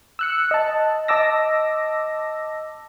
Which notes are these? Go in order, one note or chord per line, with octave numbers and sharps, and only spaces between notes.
E6 F#6 C#7
D#5 A5
D#5 A5 D6 E6 A#6